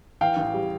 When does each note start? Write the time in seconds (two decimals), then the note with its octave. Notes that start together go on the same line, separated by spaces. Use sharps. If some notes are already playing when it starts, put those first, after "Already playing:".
0.21 E3 F5 G5
0.37 A1
0.54 G3